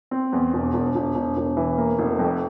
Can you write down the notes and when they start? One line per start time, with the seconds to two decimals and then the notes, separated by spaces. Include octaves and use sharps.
0.11 C4
0.33 E2
0.53 E1
0.74 E1
0.95 E1
1.15 E1
1.37 E1
1.57 E3
1.78 A#3
1.99 F1
2.19 F2